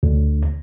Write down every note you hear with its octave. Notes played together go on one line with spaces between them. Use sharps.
D2